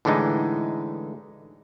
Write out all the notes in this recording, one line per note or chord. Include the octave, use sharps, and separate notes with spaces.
A2 D3 E3 G#3 D#4